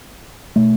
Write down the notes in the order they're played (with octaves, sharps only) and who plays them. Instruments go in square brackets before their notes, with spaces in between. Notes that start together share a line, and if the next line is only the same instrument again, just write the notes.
[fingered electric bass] B2 A3